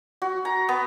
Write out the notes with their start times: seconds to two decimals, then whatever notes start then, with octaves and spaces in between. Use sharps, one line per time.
0.22 F#4
0.45 A#5
0.69 B3